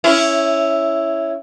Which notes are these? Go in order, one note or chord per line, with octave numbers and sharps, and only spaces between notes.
C#4 E4